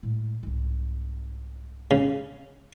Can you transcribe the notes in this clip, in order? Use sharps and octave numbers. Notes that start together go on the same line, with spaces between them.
A2 G#3
C2 G#2
C#3